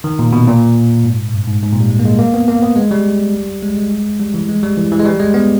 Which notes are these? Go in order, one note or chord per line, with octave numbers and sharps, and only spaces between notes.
D#3
A#2
B2
A#2
G#2
G2
G#2
G#2
A#2
G3
G#3
A#3
G#3
A#3
B3
A#3
B3
G#3
G3
G#3
G#3
G3
E3
G#3
G3
E3
E3
G#3
G3
G#3
B3